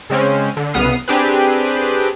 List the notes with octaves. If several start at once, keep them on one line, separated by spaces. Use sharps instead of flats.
C#3 G#3 C4 C#4
D3
C2 C#3 B3 D#6 F6 C7
C4 D4 G4 G#4 B4